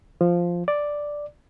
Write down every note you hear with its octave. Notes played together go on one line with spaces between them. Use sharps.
F3
D5